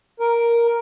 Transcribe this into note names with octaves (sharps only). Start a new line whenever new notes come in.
A#4